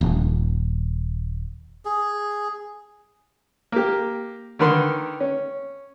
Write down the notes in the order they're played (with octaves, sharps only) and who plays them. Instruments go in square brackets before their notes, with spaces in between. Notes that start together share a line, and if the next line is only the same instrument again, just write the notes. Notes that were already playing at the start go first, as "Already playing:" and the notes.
[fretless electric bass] D#1
[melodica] G#4
[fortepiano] A#3 G4
D3 D#3 A#4 B4 B5 C6
C#4